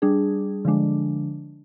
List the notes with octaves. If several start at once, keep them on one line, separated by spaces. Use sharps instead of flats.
G3 D4 G#4
D3 F3 G#3 D4